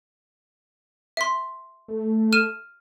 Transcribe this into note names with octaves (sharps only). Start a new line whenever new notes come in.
E5 C6
A3
F6 D#7 E7